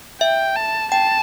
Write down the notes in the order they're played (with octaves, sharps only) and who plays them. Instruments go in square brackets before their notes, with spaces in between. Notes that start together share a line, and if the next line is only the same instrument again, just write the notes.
[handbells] E5 [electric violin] G5
[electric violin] A5
[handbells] G5 [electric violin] A5